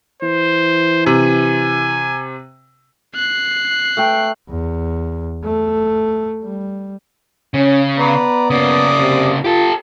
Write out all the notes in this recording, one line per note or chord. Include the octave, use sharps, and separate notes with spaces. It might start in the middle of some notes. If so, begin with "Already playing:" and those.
E3 C5
C3 G#5
F#6 C7
A3 G5
E2
A3
G3
C#3 C#4
B3 B4 D5 A#5
C#3 A#3 D5 D#6
C3
F4 G4 A4